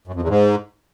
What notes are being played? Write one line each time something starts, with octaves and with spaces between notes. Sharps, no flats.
F#2
F2
E2
G#2